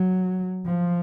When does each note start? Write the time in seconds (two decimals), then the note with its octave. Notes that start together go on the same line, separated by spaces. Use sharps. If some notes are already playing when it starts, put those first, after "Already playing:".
Already playing: F#3
0.65 F3